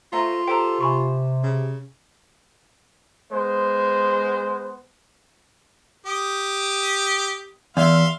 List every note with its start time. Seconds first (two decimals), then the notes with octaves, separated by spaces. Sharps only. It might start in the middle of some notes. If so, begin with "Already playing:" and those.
0.13 A3 F4 C5 A#5
0.48 G4 A4 C5 G5 A#5
0.81 C3 G#5 B5 C#6
1.43 C#3
3.32 G#3 B3 C5
6.06 G4 D#6
7.77 E2 E5 F5 C6